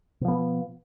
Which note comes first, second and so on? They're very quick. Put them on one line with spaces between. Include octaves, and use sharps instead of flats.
B2 F3 B3